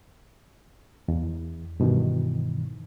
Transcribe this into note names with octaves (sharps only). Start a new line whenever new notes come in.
E2
G2 B2 D#3 E3